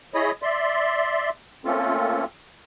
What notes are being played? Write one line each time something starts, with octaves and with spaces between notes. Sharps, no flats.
E4 G#4 C#5 D#5 B5 D#6
D5 E5 C6
A3 A#3 C4 C#4 F4 A4